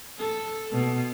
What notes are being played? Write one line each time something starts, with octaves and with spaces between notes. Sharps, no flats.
A4
B2